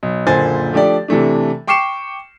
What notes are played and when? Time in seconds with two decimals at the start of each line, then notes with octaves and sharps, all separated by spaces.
0.03 B1
0.27 F#1 A#2 D3 C5 G#5 A6
0.73 F3 A3 D4 G4 D5
1.08 C3 E3 A3 D4
1.67 G5 C#6 D6 C7 C#7 E7